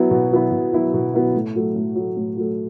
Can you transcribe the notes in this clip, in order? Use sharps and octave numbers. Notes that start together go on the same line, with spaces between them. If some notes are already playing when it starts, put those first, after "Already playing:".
Already playing: F#3 B3 E4
B2
F#3 B3 E4
B2
F#3 B3 E4
B2
F#3 B3 E4
A2
F#3 A3
A2
F#3 A3
A2
F#3 A3